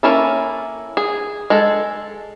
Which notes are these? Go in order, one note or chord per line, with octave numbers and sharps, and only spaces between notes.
A#3 C#4 E4 A4
G#4
G#3 A4